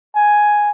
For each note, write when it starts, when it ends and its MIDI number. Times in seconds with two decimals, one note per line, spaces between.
0.16 0.71 80